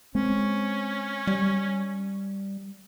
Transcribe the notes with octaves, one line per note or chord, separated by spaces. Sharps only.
G#3 C4 C#4
G3